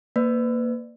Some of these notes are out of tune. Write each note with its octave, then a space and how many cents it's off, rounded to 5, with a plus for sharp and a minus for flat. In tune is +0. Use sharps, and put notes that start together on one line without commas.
A#3 +0 B4 +35 D5 +20